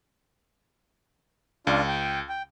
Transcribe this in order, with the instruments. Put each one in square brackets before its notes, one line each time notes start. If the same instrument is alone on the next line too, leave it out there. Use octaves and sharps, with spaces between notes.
[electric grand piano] C#2 [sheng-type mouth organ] D4 F4
[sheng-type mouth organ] G5
G5